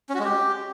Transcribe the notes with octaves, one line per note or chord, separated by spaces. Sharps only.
C#4
F#4
G#3
G4